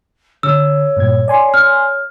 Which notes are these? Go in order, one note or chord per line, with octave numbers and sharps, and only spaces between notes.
D3 C#5 E6
G2 A#2 G#6
D5 G#5 C6
F6